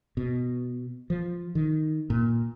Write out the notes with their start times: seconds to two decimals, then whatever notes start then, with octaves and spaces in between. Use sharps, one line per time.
0.17 B2
1.10 F3
1.55 D#3
2.10 A#2